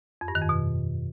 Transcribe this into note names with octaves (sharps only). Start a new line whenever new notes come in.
F2
G2
D#3
F2
B2